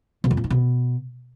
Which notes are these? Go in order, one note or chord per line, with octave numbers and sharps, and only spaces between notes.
B2
F2
A#2
D#3
B2